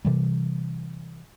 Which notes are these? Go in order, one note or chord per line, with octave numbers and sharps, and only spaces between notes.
C3 E3 G3